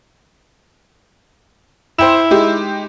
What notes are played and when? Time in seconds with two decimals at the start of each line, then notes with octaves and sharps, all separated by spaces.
1.99 E4 C5 G5 E7
2.31 G#3 D#4 G4